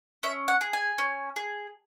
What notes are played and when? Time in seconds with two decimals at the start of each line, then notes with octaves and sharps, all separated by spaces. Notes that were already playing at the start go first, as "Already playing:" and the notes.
0.23 C#4 E5
0.48 F#5
0.61 G#4
0.73 G#5
0.98 C#4
1.36 G#4